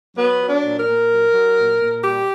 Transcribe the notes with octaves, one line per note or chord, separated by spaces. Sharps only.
F#3 B3
F#3
D4
A#2
A#4
A#2
F#3
F#3
A#2
A#2
G3 G4